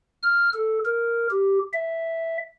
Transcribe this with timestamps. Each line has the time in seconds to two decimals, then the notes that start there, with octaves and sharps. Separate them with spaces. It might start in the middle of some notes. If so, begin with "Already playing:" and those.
0.23 F6
0.54 A4
0.85 A#4
1.31 G4
1.73 E5